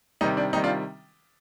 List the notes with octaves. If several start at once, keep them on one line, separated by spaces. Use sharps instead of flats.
C3 D#3 G3 D#4
D4
C3 D#3 G3 D#4
D4 F4